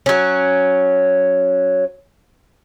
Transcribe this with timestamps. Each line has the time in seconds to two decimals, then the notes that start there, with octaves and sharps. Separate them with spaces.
0.06 F#3 C#4